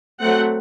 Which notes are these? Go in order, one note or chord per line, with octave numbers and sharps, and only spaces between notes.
F#3 A3 C4 F#5